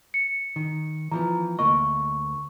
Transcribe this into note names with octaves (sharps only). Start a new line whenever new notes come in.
C#7
D#3
E3 F3 B3 A#5
D2 A#3 D#5 C#6